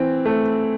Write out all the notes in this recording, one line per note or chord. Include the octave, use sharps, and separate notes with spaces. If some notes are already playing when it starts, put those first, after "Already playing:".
Already playing: E3 C4
A3